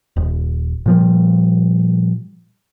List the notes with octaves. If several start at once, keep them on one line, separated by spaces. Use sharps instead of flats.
D#1
A#2 F3 G3